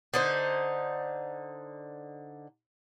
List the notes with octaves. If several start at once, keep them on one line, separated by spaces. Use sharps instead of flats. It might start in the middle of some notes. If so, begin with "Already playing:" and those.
D3 D#4 C5